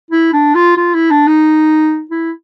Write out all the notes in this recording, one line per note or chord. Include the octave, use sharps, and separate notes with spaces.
E4
D4
F4
F4
E4
D4
D#4
E4